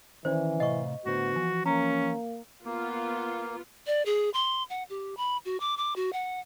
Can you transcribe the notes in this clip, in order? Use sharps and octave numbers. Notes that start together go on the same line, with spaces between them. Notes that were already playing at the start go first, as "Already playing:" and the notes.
D#3 E3 C#4 C5 D5
A2 C3 D#5 F5 C#6
A2 D3 B3 F#4 C5
E3 F3 G#5
A#3 C#4 A#5
A#3 B3 F4
D5
G#4
C6
F#5
G4
B5
F#4
D6
D6
F#4
F#5